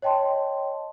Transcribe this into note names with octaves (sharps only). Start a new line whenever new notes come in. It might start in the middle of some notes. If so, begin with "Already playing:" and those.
C#5 D#5 G5 A5 C6